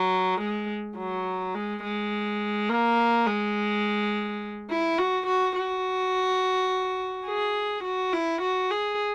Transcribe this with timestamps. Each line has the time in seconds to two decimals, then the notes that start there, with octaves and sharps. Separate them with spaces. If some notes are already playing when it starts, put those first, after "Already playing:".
Already playing: F#3
0.40 G#3
0.97 F#3
1.55 G#3
1.83 G#3
2.69 A#3
3.26 G#3
4.70 E4
4.98 F#4
5.26 F#4
5.56 F#4
7.26 G#4
7.84 F#4
8.13 E4
8.42 F#4
8.71 G#4